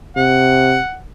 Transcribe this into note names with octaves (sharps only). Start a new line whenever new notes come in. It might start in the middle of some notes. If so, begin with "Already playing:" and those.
C3 F#5